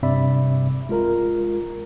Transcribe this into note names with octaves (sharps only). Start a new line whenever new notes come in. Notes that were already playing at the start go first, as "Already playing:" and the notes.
G2 C3 C4 D5 E5 B5
G#3 F4 A#4 A#5